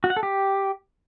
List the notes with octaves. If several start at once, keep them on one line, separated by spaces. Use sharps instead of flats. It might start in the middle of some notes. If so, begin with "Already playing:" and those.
F#4
F#5
A4
G4